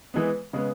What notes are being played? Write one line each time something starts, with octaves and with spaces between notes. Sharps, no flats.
E3 G#3 B3
C#3 G#3 B3